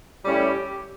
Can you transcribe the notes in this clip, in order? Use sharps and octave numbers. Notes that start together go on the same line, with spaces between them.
A2 G3 C#4 E4 G4